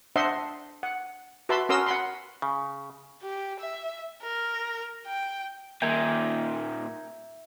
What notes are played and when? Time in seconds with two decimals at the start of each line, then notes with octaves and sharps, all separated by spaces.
0.16 D4 C5 D#5 E5 F#5 C6
0.83 F#5
1.49 F#4 B4 E5 A5 B5 C6
1.69 C#4 F#4 A#4 C6 D#6 E6
1.86 F#5 B5 C6
2.42 C#3
3.23 G4
3.60 E5
4.23 A#4
5.07 G5
5.82 A#2 D#3 E5 G5 G#5 A#5